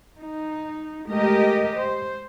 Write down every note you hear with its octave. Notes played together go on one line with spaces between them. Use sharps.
D#4
G#3 A3 G4 A#4 D#5
C5